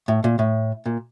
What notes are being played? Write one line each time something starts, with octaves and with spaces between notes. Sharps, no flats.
A2
A#2
A2
A#2